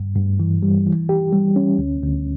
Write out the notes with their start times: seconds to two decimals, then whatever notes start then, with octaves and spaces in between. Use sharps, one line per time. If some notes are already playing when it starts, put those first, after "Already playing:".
Already playing: G2
0.16 G2
0.40 E3
0.63 G3
0.86 E3
1.09 G4
1.32 G3
1.56 C#4
1.79 D2
2.02 D2